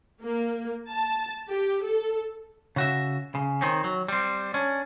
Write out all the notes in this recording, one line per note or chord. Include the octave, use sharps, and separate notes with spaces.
A#3
A5
G4
A4
C#3 F#4 E5
C#3
D#3 C4 C#4
F#3
G3 C4
C#4 D4